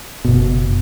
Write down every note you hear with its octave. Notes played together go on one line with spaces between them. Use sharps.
F#1 B2